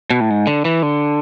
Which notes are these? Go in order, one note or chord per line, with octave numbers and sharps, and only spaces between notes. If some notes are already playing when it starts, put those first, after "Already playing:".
B2
A2
G#2
D3
E3
D3